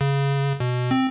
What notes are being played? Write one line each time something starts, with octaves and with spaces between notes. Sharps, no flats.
C#3
B2
C4